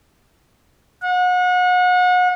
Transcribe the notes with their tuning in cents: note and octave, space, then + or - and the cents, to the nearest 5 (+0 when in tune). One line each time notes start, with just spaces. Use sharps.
F#5 -35